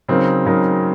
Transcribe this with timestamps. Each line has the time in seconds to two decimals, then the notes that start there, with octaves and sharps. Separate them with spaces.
0.08 C#3 F#3 C4 D#4 A#4
0.46 C#3 F#3 C4 D#4 A#4